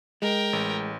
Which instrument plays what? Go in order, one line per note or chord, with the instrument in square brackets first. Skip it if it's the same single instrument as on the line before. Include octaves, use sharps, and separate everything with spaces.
[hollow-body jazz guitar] G#3 [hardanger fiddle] A#4 G5
[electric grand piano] A1